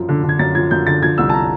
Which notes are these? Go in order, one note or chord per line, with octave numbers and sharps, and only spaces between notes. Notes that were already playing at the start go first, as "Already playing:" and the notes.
Already playing: F#2 F3
D3
D3
G#6
F#2 A6
F3 G#6
F#2 G6
D3 A6
F3 G#6
C2 E6
A5
A#5